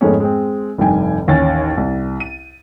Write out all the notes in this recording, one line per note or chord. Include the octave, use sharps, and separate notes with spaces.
F2 G#2 G#3 A3 B3 C#4
G#3 C4
F1 G2 D#3 G5 G#5
A1 D#2 C#4 G#5 A6
C2
D#7